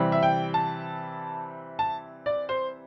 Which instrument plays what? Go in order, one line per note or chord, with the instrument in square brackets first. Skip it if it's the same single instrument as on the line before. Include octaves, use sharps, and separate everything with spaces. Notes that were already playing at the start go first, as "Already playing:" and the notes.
Already playing: [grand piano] C3 E3 G3 C4
E5
G5
A5
A5
D5
C5